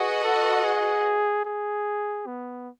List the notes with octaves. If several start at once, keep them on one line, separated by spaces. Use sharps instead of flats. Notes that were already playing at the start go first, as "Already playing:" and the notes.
Already playing: F#4 G#4 B4 D#5 F#5
A4
G#4
G#4
B3